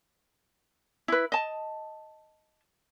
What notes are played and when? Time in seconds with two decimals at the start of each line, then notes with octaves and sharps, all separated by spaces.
1.08 E4 B4
1.32 D#5 A5